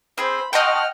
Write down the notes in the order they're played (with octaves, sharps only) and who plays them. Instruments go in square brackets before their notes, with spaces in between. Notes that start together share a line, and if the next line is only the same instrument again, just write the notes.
[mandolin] C4 G#4 [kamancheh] C5 B5
[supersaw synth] D#5 G5 [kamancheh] F#5 F6 [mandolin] A5 C6 C#6